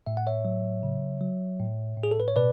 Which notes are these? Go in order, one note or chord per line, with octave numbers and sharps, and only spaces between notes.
A2 E5
F#5
C#5 E5
F#3
C#3
F#3
A2
A2
G#4
A4
B4
C#5
B2 B4 D5